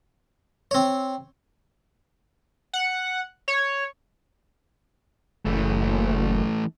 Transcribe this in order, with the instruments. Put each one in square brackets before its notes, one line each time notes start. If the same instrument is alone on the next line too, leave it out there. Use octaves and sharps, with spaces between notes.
[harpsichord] C4 C#5
[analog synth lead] F#5
C#5
[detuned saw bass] F#1 [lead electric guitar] E3 A3